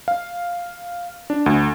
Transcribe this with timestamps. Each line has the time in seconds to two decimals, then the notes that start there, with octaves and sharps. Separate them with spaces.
0.08 F5
1.30 D4
1.46 D2